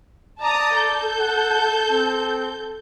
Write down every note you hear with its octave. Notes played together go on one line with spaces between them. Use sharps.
D5 A5 A#5 D#6
A4 G6
F#5
C4